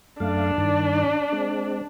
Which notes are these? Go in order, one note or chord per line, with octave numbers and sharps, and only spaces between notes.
F#2 A3 D4 D5 F5
G2 D#3
G#3 C4